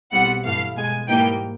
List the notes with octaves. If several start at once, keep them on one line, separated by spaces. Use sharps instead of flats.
B1 B2 G3 C4 E4 F#5
G2 E3 A3 F5
B1 B2 G#3 G#5
G#2 E3 G3 A#3 D#4 G5